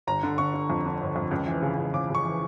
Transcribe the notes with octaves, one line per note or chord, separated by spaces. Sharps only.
G1 A#5
D3
D3 C#6
D3
F2
D3
G1
F2
C#2
E3
C#3
C#2
C#3 D6
C#3 C#6
E3